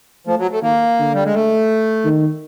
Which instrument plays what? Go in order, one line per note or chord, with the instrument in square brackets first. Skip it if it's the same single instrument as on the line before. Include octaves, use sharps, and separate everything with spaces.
[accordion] F3 [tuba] A3
[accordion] F#3
A3
[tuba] D#3 [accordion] A#3
[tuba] D3
[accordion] G3
G#3
A3
[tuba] D#3